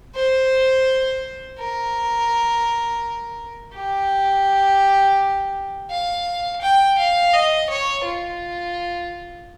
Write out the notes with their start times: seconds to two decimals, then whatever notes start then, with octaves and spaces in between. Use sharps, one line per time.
0.15 C5
1.59 A#4
3.74 G4
5.90 F5
6.62 G5
6.98 F5
7.34 D#5
7.70 C#5
8.05 F4